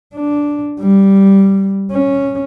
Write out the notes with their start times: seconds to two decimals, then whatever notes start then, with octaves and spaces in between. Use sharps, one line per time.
0.14 D4
0.80 G3
1.92 C#4